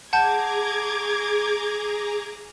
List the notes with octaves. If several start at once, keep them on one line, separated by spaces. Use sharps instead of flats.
G#4 F#5 A5 A#5 D6 G6 G#6